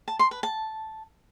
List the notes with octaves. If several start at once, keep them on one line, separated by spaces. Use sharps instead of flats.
A5
C6
B4
A5